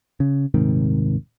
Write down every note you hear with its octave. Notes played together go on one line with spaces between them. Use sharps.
C#3
D#1 G#2 C3 D#3